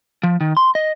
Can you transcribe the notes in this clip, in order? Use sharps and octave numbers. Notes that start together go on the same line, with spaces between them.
F3
D#3
C6
D#5